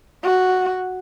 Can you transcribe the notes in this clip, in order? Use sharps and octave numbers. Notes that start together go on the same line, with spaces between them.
F#4